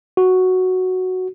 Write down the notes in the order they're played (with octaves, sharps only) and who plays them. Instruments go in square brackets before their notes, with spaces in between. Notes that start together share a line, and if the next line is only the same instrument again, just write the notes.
[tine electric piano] F#4